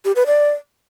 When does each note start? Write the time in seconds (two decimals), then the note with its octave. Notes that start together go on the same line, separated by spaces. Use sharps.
0.05 G4
0.16 B4
0.26 D5